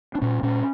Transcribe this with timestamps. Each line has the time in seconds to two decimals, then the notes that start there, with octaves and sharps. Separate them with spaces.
0.15 D4
0.21 A#2 C#4
0.43 A#2 C#4